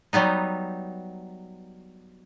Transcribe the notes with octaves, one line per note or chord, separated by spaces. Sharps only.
F#3 G3 B3 D#4